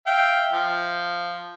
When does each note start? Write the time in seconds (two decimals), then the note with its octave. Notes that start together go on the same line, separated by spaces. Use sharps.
0.06 E5 F5 G5
0.52 F3